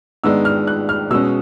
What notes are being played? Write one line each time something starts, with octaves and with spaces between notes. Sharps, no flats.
G#2 D#3 G#3 B3 D4 E6
F6
F#6
F6
B2 G#3 C#4 E6